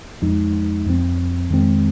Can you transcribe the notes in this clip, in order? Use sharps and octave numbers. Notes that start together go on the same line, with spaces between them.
F2 F3 G#3 D#4
F2 F3 C4
F2 D#3 G#3 C4